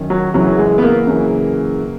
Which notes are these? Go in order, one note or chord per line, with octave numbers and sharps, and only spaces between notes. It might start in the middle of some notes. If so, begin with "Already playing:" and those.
Already playing: F#2 D#3
F#3
F#2 C#3 E3 F#3
F#3
G#3
B3
A#3
F#2 C#3 E3